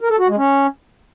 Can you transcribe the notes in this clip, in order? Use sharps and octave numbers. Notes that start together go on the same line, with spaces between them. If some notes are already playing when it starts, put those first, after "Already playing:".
A#4
A4
F#4
G#3
C#4